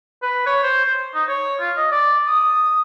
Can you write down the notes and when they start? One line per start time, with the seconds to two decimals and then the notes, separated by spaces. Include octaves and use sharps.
0.22 B4
0.46 C#5
0.63 C5
0.84 C5
1.14 D#4
1.29 C#5
1.60 F4
1.77 D#5
1.91 D5
2.27 D#6